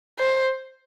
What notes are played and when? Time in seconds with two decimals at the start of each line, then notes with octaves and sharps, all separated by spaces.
0.19 C5